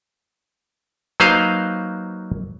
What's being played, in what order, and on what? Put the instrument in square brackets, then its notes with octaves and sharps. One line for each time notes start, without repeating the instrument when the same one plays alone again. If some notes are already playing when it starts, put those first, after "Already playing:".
[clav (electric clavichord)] F#3 A#3 D#4 B4 C5 F5